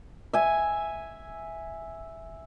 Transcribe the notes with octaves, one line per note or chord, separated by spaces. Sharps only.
E5 G#5